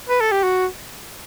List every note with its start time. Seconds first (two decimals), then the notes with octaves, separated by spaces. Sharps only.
0.09 B4
0.20 A4
0.32 G4
0.43 F#4